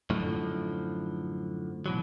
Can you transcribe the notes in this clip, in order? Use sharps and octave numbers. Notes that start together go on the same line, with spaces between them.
F#2 A2 D3 F3
B2 E3 F#3